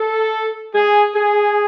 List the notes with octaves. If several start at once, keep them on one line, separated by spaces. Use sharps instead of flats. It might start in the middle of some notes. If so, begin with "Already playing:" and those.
Already playing: A4
G#4
G#4